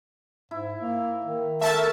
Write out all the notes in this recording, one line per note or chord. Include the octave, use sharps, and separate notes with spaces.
G#2 E4
A#3
D#3
A3 A4 A#4 E5 A5 A6